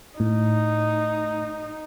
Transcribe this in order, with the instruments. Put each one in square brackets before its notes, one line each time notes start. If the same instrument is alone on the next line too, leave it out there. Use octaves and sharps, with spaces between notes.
[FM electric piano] A2 [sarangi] D#4